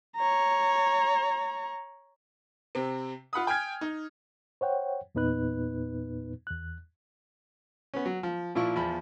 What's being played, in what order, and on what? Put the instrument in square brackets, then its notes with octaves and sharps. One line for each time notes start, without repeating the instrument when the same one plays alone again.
[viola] C#5 A#5
[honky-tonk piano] C3 C4
F4 F#5 B5 D#6
G5 G#5 F6 G#6
D#4
[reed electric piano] C5 C#5 F#5 G5
E2 A#2 B3 D#4 B4 F#6
E2 F#6
[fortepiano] B3 C#4
F#3
F3
A#2 F3 E4 F4 C#6
E2 F3 B5